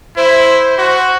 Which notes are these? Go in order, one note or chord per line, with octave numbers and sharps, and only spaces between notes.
E4 C5
F#4